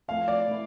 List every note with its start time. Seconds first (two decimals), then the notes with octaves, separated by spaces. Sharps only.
0.08 F2 E3 A3 E4 F5
0.28 D5
0.48 E3 A3 E4